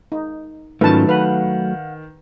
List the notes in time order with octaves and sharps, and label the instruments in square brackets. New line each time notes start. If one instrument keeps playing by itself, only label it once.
[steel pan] D#4
[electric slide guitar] G#2 C#4 F4 [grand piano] D#3 [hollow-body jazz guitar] F#3 A3 [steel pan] B4 A5
[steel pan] B4 [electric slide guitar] F5 F#5